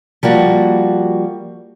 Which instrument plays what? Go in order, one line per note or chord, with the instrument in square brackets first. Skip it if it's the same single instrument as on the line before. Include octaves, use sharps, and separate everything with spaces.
[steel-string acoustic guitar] F3 G3 A#3 F#4